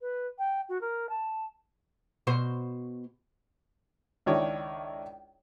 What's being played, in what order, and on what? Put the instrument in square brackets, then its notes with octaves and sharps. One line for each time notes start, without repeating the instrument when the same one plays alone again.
[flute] B4
G5
F#4
A#4
A5
[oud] B2 F#4 C5
[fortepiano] C#2 D#3 D4 E4 C#5 D#5